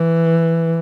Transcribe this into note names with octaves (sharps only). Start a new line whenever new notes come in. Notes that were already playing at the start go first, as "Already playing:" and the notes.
Already playing: E3